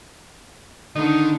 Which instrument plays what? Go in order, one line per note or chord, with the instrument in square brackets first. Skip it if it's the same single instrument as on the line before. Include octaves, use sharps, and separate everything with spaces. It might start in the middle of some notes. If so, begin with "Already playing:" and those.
[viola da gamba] D3 [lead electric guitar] D#3 [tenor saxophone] D#4